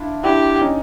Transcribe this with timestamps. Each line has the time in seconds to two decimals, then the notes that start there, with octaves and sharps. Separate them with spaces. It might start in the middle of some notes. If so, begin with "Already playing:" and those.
Already playing: D4 E4 F4
0.24 D4 E4 G4
0.62 C#4 D#4